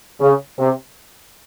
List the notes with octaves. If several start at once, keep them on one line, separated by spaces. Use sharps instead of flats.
C#3
C3